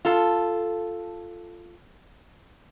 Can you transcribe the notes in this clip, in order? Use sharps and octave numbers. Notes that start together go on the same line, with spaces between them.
F4 A4